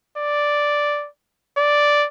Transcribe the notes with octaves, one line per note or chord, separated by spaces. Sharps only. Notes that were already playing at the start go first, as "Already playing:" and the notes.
D5
D5